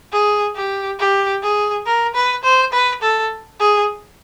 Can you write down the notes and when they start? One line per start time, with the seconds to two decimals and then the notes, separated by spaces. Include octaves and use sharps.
0.12 G#4
0.55 G4
0.99 G4
1.42 G#4
1.86 A#4
2.15 B4
2.44 C5
2.73 B4
3.02 A4
3.60 G#4